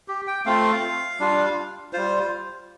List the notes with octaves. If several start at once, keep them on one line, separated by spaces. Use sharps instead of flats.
G4
G5
A3 C4 F4 F5
G3 D4 F4
G3 F4 C5